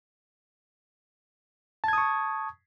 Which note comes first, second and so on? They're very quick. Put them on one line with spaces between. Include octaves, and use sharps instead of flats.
A5 G#6 D#6 C#6